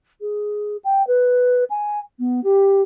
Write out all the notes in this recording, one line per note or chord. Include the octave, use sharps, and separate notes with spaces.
G#4
G5
B4
G#5
B3
G4